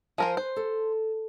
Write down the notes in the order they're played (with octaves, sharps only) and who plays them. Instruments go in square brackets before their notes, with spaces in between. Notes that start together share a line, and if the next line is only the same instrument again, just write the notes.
[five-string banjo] F3 A#4 C5 [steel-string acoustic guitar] G#5
[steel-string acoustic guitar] B4 [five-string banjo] C5
[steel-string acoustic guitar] A4